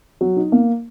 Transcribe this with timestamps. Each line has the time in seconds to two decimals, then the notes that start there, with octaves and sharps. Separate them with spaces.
0.21 F#3
0.37 D#4
0.52 A#3